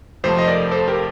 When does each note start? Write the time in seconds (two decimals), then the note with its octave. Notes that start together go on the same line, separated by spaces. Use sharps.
0.24 F2 C3 F3 A3 A4 C5
0.38 D#5
0.48 A#4 D5
0.71 A4 C5
0.88 G4 A#4